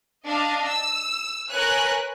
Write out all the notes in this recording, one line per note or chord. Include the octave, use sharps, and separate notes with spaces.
D4 D#5 F5
E6
A#4 B4 C#5 G#5 F#6